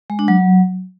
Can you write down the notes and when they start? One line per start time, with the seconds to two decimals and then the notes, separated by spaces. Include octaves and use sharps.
0.10 G#3
0.19 D4
0.28 F#3